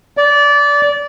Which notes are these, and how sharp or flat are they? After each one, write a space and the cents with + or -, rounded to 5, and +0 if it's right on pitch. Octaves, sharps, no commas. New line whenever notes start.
D5 -20